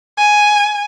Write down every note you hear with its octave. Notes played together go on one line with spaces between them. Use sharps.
G#5